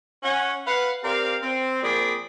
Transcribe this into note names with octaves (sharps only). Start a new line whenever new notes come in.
C#4 F#5
B4 F5 F#5
C4 G4 A#4 D5 F5
C4
A#2 F3 C4 G#4 D5 B5